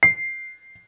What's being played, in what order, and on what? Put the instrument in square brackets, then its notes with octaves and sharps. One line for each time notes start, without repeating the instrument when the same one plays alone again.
[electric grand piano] C7